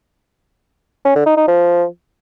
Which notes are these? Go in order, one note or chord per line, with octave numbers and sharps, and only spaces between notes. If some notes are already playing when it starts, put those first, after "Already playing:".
C#4
D3
D#4
D#4
F3